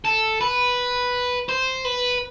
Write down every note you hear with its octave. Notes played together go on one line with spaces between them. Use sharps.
A4
B4
C5
B4